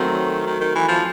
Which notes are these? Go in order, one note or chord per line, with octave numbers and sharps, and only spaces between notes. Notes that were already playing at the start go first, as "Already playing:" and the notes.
Already playing: D#3 F#3 A3 C4
D#3
D#3
E3
F3